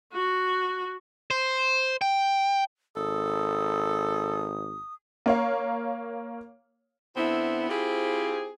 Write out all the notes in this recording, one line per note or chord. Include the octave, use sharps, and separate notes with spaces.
F#4
C5
G5
G#1 A4 D#6
A#3 C#5 F5
D3 B3 C4 E4
C4 E4 F4 G4 G#4 C5